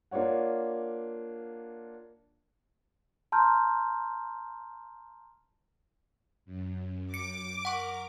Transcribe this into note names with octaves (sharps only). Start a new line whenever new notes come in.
A#3 D4 F4 C#5 F#5
A5 A#5 C6 F6 G6
F#2
D6 C#7
A#4 F#5 C#6